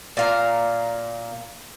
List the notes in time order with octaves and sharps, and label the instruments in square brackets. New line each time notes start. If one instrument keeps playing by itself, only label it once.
[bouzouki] A#2 F5 A#5